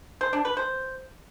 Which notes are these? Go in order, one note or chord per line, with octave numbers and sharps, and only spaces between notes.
C5
D4
B4
C5